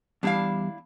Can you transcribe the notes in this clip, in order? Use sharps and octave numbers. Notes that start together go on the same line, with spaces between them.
E2 G3 D4 E4 F5